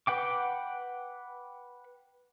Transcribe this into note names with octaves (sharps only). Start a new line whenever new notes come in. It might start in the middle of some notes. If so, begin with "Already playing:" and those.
B4 F#5 G5 D6